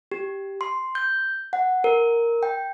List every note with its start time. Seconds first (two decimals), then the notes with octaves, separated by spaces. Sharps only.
0.12 G4
0.61 C6
0.95 G6
1.53 F#5
1.84 A#4
2.43 G5